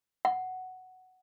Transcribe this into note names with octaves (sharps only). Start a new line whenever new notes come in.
F#5